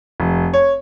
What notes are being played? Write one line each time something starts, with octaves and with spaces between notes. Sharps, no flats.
F1
C#5